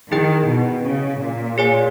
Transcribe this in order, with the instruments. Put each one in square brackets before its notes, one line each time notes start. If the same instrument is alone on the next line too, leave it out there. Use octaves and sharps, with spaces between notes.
[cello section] D#3 [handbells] E4 G#4 D#5 G5
[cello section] B2
C#3
A#2
[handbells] G#4 C#5 G#5